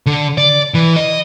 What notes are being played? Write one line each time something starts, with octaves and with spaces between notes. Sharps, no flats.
D3
D5
E3
D#5